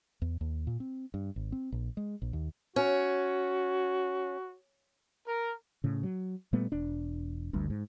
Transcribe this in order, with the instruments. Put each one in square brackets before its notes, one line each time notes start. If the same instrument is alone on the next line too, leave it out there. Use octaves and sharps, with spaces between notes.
[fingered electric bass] E2
D#2
A#2
C4
G2
G#1
C4
A#1
G#3
A#1
D#2
[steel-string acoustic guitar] C#4 [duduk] F#4
[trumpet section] A#4
[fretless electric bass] A2 C#3
F#3
A#2 G3 A3 B3
E1 D4
G1 D2 G2
G#2